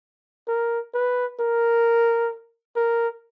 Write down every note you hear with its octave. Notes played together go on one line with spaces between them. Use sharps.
A#4
B4
A#4
A#4